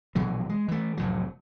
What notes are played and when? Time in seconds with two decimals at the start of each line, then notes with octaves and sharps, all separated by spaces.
0.15 A#1 B2 E3 F#3
0.49 G#3
0.68 E3 A3
0.97 F1 A2 F#3